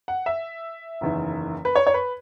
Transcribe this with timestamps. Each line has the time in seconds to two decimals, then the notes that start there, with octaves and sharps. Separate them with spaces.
0.08 F#5
0.26 E5
1.01 F#1 E2 D#3
1.65 B4
1.75 C#5
1.87 C#5
1.94 B4